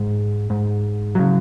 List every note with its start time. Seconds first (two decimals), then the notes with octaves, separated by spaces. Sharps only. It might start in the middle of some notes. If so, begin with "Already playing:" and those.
Already playing: G#2
0.50 G#2
1.15 C#3 F#3